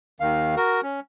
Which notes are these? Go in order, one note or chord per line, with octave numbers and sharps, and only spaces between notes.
D#2 D#3 F5
F#4 A#4
C#4